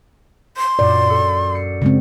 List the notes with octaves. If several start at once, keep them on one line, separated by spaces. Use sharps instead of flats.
C6
F#2 A#2 D5
A4
C7 C#7
C#3 G#3 C4